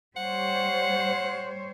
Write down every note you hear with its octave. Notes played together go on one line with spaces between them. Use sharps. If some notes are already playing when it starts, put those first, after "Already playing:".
G3 C5 C#5 F#5